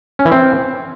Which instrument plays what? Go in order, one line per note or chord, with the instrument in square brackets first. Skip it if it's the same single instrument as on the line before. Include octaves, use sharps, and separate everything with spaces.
[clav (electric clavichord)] C#4
E3
C4